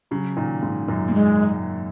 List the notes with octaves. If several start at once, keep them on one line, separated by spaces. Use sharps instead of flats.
C#3 F#3
A#2 D#3
G#2 C#3
F#2 A#2
A#3
G#3